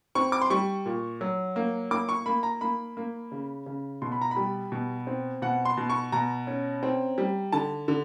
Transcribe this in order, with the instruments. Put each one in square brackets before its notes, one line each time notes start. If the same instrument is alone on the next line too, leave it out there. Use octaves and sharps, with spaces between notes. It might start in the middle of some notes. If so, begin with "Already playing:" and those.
[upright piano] C4 C#6
D6
C6
G3 C#6
A#2
F#3
A#3
A#3 D6
C#6
A#3 B5
A#5
A#3 B5
A#3
C#3
C#3
B2 C6
B5
A#5
B5
G3
B2
C4
B2 F#5
C6
B2
C#6
B2 A#5
C#4
C4
G3
D3 A5
D3